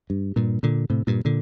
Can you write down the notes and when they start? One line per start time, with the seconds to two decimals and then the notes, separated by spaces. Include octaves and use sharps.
0.10 G2
0.36 G2 A#2
0.63 A#2 D3
0.90 A2 C3
1.07 G2 A#2
1.25 A#2 D3